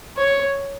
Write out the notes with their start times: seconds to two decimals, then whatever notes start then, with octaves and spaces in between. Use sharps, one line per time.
0.17 C#5